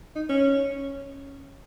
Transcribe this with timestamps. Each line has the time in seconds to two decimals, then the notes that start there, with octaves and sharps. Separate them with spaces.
0.16 D#4
0.29 C#4